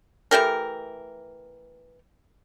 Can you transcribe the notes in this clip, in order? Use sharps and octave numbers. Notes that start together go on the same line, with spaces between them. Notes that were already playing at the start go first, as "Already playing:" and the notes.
E3 A3 G4 A#4